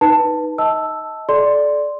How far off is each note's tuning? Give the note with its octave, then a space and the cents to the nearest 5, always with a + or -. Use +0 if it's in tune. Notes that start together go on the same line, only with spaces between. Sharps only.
D#4 +0 B4 -5 A5 +15
D#5 +30 A5 +0 E6 +0
A4 -35 D5 +0 C6 +0